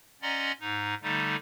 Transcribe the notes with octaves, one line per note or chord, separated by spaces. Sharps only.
C#4 D5 D#5 F#5 A#5 C6
G#2 D#4
D3 G3 A3 D#4